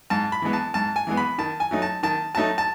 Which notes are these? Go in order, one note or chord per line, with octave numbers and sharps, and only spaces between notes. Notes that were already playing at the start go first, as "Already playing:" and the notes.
G#2 A5
B5
E3 G#3 B3
A5
G#2 A5
G#5
E3 G#3 B3
B5
D#3 A5
G#5
F#3 A3 D#4
A5
D#3 A5
F#3 A3 D#4 A5
A5